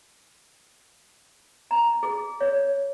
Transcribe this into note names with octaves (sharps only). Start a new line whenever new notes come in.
A#5
G#4
C#5